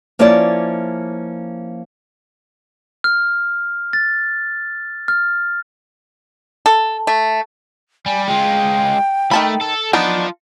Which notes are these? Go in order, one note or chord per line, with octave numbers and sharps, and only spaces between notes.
F3 A#3 C#4 E4 C#5 D5
F6
A6
F6
A4
A3
G3 G#5
G#3 F4 G5
D#3 A3 A5 B5
A4
B3 D4 D#4 F4 A5